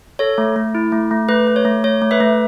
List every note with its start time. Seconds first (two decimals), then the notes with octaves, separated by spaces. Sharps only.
0.19 A4 C#5
0.38 A3
0.56 A3
0.75 E4
0.92 A3
1.11 A3
1.29 A3 B4
1.47 A3
1.56 C#5
1.65 A3
1.84 A3 C#5
2.02 A3
2.11 B4 E5
2.20 A3